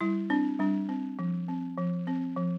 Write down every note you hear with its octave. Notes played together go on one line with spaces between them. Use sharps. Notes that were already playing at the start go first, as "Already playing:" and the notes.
G3 E4
C4 D4
G3 D4
C4
F3
C4
F3
C4
F3